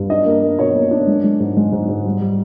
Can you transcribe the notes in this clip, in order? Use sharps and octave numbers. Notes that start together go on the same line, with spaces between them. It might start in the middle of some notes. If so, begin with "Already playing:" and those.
Already playing: G2
D4 D#5
A#3
A#3
B2 C#5
A#3
D4
G#3
G#3
G#2
G#3
G#2
G#2
G3
G3